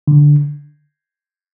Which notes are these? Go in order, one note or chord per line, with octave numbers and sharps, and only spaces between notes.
D3